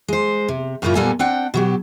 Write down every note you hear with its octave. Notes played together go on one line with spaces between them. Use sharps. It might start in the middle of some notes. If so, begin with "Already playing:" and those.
G#3 C5
C3
F#2 A2 C#3 A#3 E4 F4
A#2 G3 A#3 B3 A4 G#5
C4 D4 F#5 G5
B2 F#3 G4